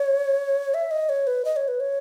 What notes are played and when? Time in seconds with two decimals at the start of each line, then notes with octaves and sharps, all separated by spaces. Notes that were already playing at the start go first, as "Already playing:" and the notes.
Already playing: C#5
0.74 E5
0.91 D#5
1.09 C#5
1.27 B4
1.45 D#5
1.56 C#5
1.68 B4
1.80 C#5